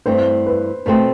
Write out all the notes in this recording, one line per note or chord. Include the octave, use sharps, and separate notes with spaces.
G2 E3 A3 C4 C5
B4
B2 A3 C4 C5